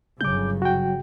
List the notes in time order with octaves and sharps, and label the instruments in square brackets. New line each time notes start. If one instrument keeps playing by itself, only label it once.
[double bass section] G1 C#3 [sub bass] F#3 [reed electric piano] D6 G6
[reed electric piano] F#4 G5